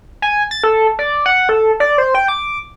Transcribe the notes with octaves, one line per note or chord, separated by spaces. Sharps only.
G#5
A6
A4
D5
F#5
A4
D5
C5
G5
D6